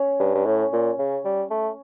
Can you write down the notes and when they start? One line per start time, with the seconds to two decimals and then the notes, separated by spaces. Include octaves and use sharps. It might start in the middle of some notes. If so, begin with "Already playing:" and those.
Already playing: C#4
0.19 G2
0.34 G2
0.46 A2
0.73 A#2
0.99 C#3
1.25 G3
1.50 A3